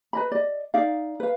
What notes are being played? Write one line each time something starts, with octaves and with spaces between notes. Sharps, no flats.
B4 D#5 B5
D5 D#5
D#4 D5 E5 F5
B4 F5